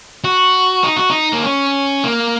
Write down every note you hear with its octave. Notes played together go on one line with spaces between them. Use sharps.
F#4
D#4
F#4
D#4
A#3
C#4
A#3